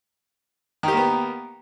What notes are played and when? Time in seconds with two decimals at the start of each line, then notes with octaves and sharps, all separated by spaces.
0.83 D#3
0.88 G4
0.92 A#3
0.97 B3